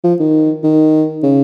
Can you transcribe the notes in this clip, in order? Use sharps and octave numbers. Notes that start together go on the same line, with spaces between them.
F3
D#3
D#3
C#3